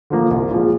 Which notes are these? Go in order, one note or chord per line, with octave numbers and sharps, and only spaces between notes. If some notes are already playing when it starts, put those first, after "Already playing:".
D3 F3 A#3
C2
A#2 F3 G#3